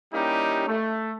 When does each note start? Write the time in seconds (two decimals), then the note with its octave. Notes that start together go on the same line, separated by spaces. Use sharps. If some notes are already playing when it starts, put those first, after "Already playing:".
0.13 G3 A#3 C#4 D#4 E4 G4
0.67 A3